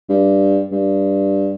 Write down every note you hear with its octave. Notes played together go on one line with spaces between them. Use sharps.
G2
G2